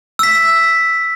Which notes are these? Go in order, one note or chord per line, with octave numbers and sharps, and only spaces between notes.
E6 B6